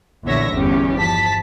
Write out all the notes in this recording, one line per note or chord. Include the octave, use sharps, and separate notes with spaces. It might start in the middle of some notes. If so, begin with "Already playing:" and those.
A#1 E2 D3 C#5 E5 A#6
G1 E2 C#4 G4
F3 A5 B6